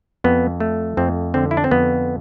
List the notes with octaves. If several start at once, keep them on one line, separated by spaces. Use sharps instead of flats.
F2 B3
A3
F2 C4
D3 C4
E4
D4
C4
F2 B3